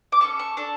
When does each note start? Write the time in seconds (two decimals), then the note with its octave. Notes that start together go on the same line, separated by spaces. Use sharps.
0.12 D6
0.21 C#4 E4 A4 C#6
0.39 C#6
0.57 D4 A4